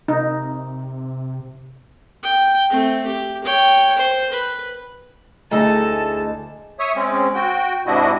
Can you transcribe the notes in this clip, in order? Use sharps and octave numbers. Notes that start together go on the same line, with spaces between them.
C3 D#4
G5
A3 C4
G4
C#5 G5
C5
B4
D2 D#4 E4 G#4 A4 A5 A#5
C#5 E5 D#6
G#3 C4 C#4
F#4 G5
G#2 C3 D4 E4 F#4 D#5